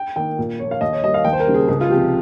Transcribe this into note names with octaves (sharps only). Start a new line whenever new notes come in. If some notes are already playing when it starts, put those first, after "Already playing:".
Already playing: G5
D#3 A#3 G5
A#2
F3 A#3 C#5
F5
D#2 D#5
C#5
D#3 G3 A#3 D#5
F5
D#2 G5
C5
A#4
C#3 G3 A#3
G#4
C#2 G#4
F4
C3 F3 G4